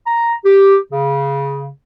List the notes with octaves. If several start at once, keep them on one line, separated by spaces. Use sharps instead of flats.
A#5
G4
C#3